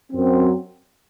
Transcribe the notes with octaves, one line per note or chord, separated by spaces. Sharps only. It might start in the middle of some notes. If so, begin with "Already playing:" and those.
F#2 F#3 C4